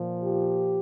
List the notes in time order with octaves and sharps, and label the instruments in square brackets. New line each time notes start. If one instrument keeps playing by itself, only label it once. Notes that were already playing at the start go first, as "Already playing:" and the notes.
Already playing: [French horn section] A#2 F3
G4